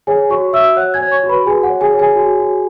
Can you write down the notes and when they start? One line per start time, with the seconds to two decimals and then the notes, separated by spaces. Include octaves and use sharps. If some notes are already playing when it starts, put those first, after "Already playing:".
0.07 G#4 C#5 G#5
0.30 F#4 C#5 C#6
0.53 F#4 E5 E6
0.76 C#5 F#5 F#6
0.94 G#5 G#6
1.01 C#5
1.12 C#5 C#6
1.23 F#4
1.29 B4 B5
1.46 F#4 G#4 G#5
1.63 F#5
1.69 C#5
1.81 G#4 G#5
1.93 C#5
1.99 G#4 G#5
2.16 F#4
2.40 F#4